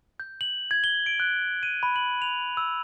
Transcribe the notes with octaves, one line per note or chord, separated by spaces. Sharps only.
G6
F#7
G#6
G7
D7
F#6
D#7
B5
F#7
F7
E6